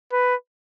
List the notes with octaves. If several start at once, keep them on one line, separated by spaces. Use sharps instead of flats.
B4